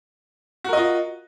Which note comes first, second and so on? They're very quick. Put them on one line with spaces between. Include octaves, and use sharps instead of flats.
F#4 A#4 D#5 F4